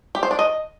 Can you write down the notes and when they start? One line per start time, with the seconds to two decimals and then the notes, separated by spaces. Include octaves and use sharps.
0.15 G4
0.23 C5
0.31 D4
0.39 D#5